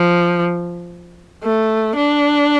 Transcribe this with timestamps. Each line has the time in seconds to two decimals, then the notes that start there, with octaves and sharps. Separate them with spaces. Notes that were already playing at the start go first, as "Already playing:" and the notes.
Already playing: F3
1.43 A3
1.96 D4